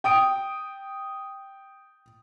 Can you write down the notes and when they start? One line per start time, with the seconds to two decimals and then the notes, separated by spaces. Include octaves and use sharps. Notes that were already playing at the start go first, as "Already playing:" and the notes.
0.04 G5 D#6 D7